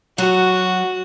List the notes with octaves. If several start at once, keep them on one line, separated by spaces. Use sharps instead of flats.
F#3 F#4